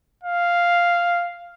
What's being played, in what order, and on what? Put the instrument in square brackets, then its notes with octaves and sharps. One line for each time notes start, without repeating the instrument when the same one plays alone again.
[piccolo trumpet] F5